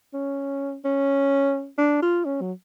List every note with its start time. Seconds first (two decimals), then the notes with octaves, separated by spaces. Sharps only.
0.14 C#4
0.85 C#4
1.78 D4
2.02 F4
2.25 C#4
2.41 F#3